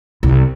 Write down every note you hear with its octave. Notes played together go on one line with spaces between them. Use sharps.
C2